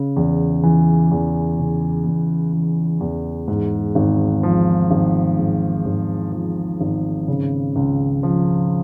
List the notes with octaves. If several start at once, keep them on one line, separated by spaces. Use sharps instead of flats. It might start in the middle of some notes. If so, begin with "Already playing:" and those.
Already playing: C#3
E2
E3
E2
C#3
E2
E3
E2
G#2
G#1
F3
G#1
G#2
G#1
F3
G#1
C#3
C#2
F3